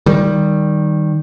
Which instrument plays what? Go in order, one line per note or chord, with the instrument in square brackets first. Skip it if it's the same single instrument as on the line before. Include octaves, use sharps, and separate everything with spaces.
[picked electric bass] D#3 G3